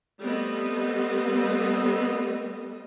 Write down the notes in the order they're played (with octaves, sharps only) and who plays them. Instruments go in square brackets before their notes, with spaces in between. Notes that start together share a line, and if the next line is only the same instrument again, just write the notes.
[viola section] G3 A3 B3 C4 D#5